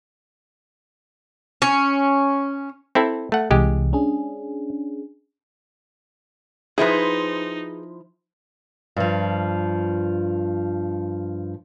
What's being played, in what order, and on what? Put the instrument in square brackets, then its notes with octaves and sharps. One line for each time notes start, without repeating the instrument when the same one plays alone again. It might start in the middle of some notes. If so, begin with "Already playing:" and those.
[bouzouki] C#4
[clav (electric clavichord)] C4 E4 A4
A3 F#5
[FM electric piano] C2 C3 E3 [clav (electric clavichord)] G#3 G4
[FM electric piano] C#4 D4 G#4
[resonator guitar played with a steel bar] F3 E4 C5 [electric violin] D#4 [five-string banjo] G#4 B4
[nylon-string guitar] G2 F3